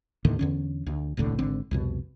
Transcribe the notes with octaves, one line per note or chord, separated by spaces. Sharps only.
D#2 A2 D3 D#3
E2 D3 C#4
D2
D#1 C2 A2 D3
G#1 D3 C4
C2 F2 B2